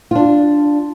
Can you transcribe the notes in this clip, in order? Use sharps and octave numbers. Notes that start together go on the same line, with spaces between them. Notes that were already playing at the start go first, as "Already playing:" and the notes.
D4 F4